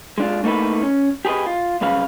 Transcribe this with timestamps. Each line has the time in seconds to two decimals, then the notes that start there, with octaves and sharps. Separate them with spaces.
0.18 G#3 D4 F4
0.44 A3 A#3 D#4 E4 B4
0.83 C#4
1.25 G4 G#4 A#4 B4 D#5
1.46 F4
1.81 C2 F#2 C#3 B4 F5